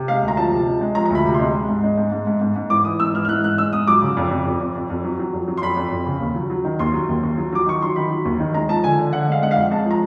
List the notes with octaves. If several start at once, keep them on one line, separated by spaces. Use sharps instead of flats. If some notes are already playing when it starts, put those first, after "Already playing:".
Already playing: C3
G#3 F5
D2
A#5
F3 A5
C3
G#3
G#3
F3 A#5
A#5
D2 B5
C3
C6
G#3
G#3
G#2
G#3
G#2
G#2
G#2
G#2
G#2
E3 D6
E3 D#6
G#2 E6
E3 F6
F6
G#2 F#6
G#2 F#6
G#3 E6
G#2 D#6
F#3 D6
C#3
F2
F2
F2
F2
F2
F2
F#3
F#3
F2
F#3
C6
F2 B5
F2
F2
C#3
D#2
F#3
F#3
D#3
D#2 C6
F#3
D#2
D#2
F#3
F#3 D6
D#3 C#6
F#3 C6
D#3 B5
F#3
D#2
D#3
G#3 A#5
F3 A5
D3 G#5
D3
D3 F#5
G#3 F5
G#3 F#5
F5
F2
G#3 A5
F3
A#5